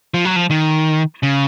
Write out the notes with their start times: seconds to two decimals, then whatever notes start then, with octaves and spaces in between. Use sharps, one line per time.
0.14 F3
0.25 F#3
0.36 F3
0.50 D#3
1.23 C#3